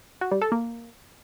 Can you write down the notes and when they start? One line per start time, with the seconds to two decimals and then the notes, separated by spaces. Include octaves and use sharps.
0.21 F#4
0.31 G3
0.42 A4
0.52 A#3